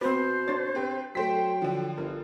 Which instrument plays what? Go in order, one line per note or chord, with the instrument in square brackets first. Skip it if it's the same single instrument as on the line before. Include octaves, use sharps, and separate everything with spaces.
[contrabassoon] B2 [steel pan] C4 B4 [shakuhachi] C5
[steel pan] D4 C#5 [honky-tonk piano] A6
[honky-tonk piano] C4 G4 B4
[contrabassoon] F#3 [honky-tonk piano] A3 C5 B6 [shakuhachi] G5
[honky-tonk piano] D3 F3
[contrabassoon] G1 [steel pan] A#4